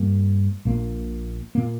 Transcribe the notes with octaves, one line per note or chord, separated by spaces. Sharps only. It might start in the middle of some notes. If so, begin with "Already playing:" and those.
Already playing: G2 G3 A#3
A#1 A#2 A#3
A#2 A#3